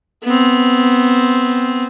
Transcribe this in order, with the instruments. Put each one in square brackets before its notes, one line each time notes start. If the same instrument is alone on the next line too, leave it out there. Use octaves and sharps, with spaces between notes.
[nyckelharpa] B3 C4